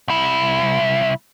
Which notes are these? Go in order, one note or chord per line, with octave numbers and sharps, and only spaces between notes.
C2 E4